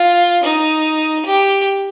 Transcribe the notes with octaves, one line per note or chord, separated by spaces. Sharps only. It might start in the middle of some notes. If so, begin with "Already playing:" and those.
Already playing: F4
D#4
G4